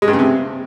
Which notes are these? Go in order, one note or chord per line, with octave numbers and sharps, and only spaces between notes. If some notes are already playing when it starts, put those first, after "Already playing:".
G#3
G2
C#3
C3